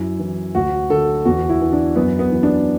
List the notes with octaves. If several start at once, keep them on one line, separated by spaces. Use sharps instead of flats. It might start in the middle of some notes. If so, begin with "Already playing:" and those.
Already playing: F#2 E4
E3
D2 F#4
D3 A4
E2 F#4
E4
E3
D4
F#2 B3
B3
E3
D4